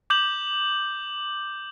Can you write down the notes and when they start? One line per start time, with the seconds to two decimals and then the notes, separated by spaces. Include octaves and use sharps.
0.10 D6 G6 F#7